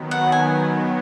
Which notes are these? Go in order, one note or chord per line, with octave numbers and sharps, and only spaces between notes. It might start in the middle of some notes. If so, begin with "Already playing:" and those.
Already playing: D#3 F#3 B3
F#5
G#5